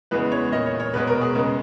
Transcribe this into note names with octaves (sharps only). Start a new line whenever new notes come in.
E2 C#3 E3 G#3 B3 B4
C#5
A#2 A#3 D#5
C#5
C#5
E2 B2 G#3 B3 B4
A#4
G#4
C#3 G#3 B3